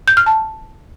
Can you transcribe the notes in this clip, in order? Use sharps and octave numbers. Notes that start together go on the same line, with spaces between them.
G6
F6
A5